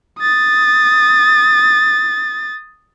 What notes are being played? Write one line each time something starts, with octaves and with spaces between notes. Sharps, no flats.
D#6 A6